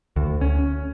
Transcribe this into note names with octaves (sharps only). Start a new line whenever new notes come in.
D2
C#4